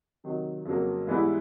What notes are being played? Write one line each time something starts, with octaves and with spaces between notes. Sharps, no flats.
C3 D#3 F#3
F2 C#3 F#3 A#3
G#2 E3 G3 B3 E4